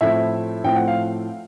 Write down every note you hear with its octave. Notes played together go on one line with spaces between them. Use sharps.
A2 F3 A3 C4 E4 E5
A2 F3 A3 C4 G5
F#5
F5